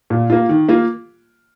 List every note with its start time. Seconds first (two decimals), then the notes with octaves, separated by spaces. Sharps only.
0.10 A#2
0.30 A#3 F4
0.49 D#3
0.69 A#3 F4